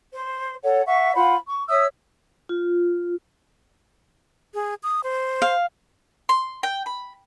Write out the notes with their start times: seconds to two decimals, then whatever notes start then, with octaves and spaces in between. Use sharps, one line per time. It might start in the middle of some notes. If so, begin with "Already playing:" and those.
0.13 C5
0.63 A4 C#5 F#5
0.86 E5 F#5 C#6
1.14 F4 C5 F#5 B5
1.46 C#6
1.68 C#5 E5 D#6 E6
2.49 F4
4.54 G#4
4.83 D#6
5.04 C5
5.42 F5
6.29 C6
6.63 G5
6.86 B5